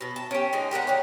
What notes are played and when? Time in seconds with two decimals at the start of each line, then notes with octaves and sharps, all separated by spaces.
0.01 B2 A4
0.16 A5
0.31 C#4 G4
0.53 D3 G#3 D#4 G#5
0.71 G4 A#4 B4 F#5
0.87 D3 A3 C#4